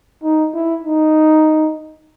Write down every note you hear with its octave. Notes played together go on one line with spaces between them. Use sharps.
D#4
E4
D#4